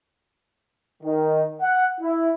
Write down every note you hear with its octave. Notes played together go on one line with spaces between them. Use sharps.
D#3
F#5
E4